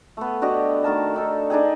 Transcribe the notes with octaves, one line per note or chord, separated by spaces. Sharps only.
A3 B3
D4 F#4 G4 D#5
D#3 A3 A#4 A5
D4 D#4 A4
D4 D#4 G#4 G5